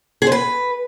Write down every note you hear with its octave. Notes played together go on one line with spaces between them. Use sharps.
G#4
C5
B4